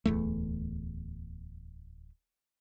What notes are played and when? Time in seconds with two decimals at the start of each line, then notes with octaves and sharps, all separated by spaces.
0.06 D1 E2 A3